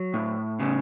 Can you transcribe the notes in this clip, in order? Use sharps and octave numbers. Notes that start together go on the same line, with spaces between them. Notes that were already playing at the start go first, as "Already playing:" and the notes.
Already playing: F#3
A2
C#3